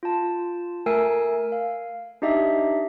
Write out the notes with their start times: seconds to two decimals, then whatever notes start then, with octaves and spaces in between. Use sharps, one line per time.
0.03 F4 A5
0.86 A3 A#4 G#5 E6 C7 D7
1.52 F5
2.22 D4 D#4 G4 D#5 E5